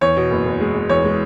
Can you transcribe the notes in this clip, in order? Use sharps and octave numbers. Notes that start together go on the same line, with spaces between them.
E2 C#5
B2
F#1
F#1
G#3
G#3
E2 C#5
G#3